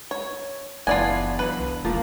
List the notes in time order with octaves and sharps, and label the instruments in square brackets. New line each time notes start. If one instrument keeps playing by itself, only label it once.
[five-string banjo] C#5
[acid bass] F#1 [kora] E3 B3 D4 [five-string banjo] F4 D5 G#5
[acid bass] F#3 [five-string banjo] B4
[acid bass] C2
[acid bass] E1 [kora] F3 A#3